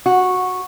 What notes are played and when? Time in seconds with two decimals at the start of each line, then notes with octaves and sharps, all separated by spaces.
0.06 F#4